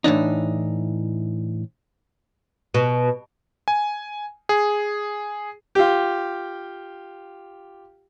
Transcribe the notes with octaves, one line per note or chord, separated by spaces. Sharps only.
A2 E3 D4 D#4
B2
G#5
G#4
F4 G4